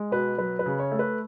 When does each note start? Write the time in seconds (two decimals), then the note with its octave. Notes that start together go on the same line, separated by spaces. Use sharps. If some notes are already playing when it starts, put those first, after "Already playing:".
Already playing: G#3
0.11 B2 B4
0.38 F#3 B4
0.59 B4
0.66 C#3
0.79 C#5
0.92 A3
0.99 B4